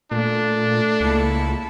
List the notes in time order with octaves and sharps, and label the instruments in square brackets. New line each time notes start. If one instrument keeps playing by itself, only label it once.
[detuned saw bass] A#2 [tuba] A3 [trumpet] D4
[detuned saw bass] C#2 [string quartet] A#3 E4 A4